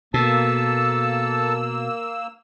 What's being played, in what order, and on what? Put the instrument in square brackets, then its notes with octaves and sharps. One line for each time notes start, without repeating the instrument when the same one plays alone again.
[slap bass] B2 [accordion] A#3 E6 [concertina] A4 A5